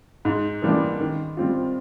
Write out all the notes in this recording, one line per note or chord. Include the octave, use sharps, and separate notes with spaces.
G#2
E3 G3 A#3 D4
D#3
G3 C4 F4